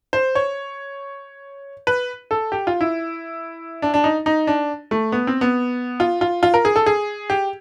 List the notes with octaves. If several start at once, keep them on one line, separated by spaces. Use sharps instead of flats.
C5
C#5
B4
A4
G4
F4
E4
D4
D4
D#4
D#4
D4
A3
B3
C4
B3
F4
F4
F4
A#4
G#4
A4
G#4
G4